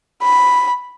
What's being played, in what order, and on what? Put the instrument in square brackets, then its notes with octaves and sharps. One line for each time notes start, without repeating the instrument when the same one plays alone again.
[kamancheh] B5